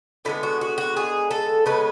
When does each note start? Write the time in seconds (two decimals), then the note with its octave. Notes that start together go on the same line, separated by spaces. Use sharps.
0.25 D3 G#3 B3 E4
0.43 F#4
0.61 F#4
0.78 F#4
0.97 G#4
1.31 A4
1.66 C#3 G#3 B3 B4